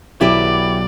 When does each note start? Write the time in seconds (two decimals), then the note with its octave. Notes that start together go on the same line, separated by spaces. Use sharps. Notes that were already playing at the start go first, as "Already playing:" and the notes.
0.21 B1 E4 G4 B4 D5